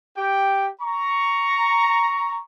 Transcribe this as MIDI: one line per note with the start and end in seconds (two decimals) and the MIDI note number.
0.16 0.69 67
0.16 0.69 79
0.82 2.41 82
0.82 2.41 85